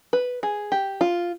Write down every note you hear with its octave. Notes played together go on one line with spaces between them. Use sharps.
B4
G#4
G4
F4